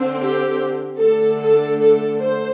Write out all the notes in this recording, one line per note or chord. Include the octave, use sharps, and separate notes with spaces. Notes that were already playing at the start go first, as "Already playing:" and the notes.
Already playing: D3 C4
G4
D3 A3 D4 A4
A4
A4
C5